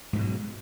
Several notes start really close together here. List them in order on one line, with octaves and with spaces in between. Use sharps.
G#2 F3 B2 F#3